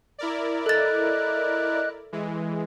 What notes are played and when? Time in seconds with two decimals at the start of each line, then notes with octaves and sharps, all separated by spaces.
0.18 E4 A#4 D5
0.66 A4 D#5 F#6 A6
2.12 E3 G#3